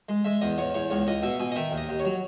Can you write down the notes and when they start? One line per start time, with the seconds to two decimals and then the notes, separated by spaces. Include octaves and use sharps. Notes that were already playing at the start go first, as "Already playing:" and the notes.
0.09 G#3
0.25 G#3 E5
0.41 E2 D#5
0.58 E2 C#5
0.74 E2 C#5
0.90 C#2 C#5
1.07 C#2 D#5
1.23 B2 E5
1.40 B2 G#5
1.52 D#5
1.56 D#3 E5
1.71 D#2
1.77 D#5
1.89 D#2
1.99 C#5
2.05 F#3